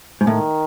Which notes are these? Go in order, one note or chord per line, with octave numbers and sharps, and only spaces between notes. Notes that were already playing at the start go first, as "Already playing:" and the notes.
G#2
A2 D#3